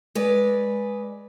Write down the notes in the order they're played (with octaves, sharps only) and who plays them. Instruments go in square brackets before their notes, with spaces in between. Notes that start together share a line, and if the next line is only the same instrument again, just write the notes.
[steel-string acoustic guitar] G#3 B4 D5